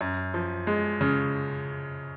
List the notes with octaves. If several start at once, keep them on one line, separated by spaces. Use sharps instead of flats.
F#2
F3
G#3
C#3